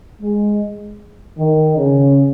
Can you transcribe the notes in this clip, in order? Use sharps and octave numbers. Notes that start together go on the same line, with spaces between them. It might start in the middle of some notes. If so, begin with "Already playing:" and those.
G#3
D#3
C#3